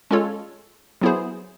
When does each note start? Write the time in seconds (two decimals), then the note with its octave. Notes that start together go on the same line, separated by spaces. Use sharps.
0.11 G#3 C#4 F4 A4 C#5
1.01 F#3 B3 E4 G#4 C5